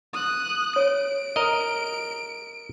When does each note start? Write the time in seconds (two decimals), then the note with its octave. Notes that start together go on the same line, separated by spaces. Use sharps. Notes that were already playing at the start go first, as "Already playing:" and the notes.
0.13 D#6 F#6
0.76 C#5 D7
1.36 A#4 D#5